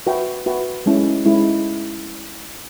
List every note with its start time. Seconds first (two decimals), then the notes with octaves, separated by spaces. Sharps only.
0.07 F#4 B4 E5 G5
0.46 F#4 B4 E5 G5
0.86 G#3 C#4 E4
1.25 G#3 C#4 E4